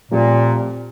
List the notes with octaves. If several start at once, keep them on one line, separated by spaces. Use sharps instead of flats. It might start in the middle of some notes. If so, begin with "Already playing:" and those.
A#2 F3 A3 C4 G4